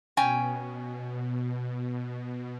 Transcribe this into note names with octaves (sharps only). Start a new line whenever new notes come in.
B2 C#4 G5 G#5